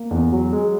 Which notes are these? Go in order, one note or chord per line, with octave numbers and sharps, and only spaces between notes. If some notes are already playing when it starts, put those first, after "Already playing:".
Already playing: A#3
E2
F#3
G#3